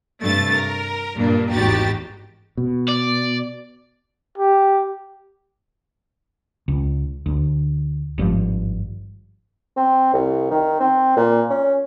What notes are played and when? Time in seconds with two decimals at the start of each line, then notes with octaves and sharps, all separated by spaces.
0.23 G2 C3 A3 A5 A6
0.54 A#4
1.16 G2 A#2 A#3 D4
1.51 G#1 E2 F#4 G4 A#5 A6
2.57 B2
2.88 D5
4.38 G4
6.68 C#2
7.26 D2
8.18 G#1 G2 D#3 F3
9.77 C4
10.14 C2
10.51 D#3
10.80 C4
11.17 A#2
11.50 C#4